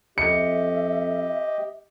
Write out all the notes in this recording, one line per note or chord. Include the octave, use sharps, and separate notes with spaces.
F2 G4 D#5 E5 C#7